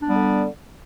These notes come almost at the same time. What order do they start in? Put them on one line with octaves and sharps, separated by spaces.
D4 B3 G3 D3